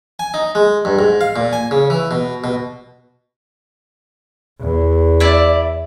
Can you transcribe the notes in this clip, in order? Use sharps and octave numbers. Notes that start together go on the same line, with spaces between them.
G#5
D#4
G#3
G2
G#2
F5
A#2
G#5
C#3
E3
B2
B2
E2
E4 D5